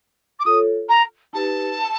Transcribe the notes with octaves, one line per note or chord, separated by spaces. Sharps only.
D6
F4 A4 C#5 D#6
A#5
D#4 G4 B4 A5